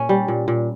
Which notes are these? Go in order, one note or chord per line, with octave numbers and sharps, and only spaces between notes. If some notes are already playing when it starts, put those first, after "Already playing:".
Already playing: A#2 C#4
G3
A#2
A#2